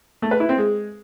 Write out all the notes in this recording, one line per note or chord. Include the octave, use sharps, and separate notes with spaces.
A3
B4
E4
C4
G#3